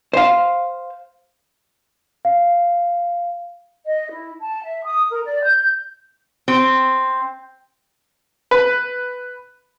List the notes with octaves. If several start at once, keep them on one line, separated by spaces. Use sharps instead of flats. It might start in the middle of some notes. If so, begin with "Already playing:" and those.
C5 F5
F5
D#5
E4
A5
E5
D#6
A#4
D5
G6
C4
B4